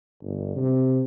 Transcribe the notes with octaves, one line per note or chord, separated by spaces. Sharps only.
G1
C3